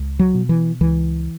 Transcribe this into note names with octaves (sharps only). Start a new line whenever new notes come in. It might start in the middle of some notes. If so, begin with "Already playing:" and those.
Already playing: C#2
F#3
B2
E3
C#2 E3